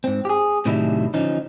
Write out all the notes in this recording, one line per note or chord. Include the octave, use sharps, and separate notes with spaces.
G#2 C4
G4 G#4
A2 C3 D#3 F#3 D4 E4
D3 F3 C#4 D#4